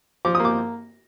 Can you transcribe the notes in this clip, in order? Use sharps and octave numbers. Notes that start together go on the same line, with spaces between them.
F3 D6
D#6
A#3
D6